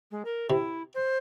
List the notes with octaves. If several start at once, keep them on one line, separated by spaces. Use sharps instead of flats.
G#3
A#4
C3 E4
C5